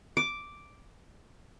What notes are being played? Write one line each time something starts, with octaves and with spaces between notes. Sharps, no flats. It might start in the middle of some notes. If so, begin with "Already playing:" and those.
D6